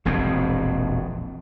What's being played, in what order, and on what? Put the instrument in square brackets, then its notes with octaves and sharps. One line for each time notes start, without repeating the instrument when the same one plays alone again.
[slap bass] E1 A#1 F2 C4